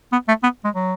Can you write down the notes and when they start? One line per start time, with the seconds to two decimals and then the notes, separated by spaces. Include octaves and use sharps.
0.12 B3
0.28 A3
0.43 B3
0.64 G#3
0.75 F#3